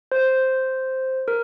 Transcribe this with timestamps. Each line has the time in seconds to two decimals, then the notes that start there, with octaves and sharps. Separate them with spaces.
0.12 C5
1.28 A#4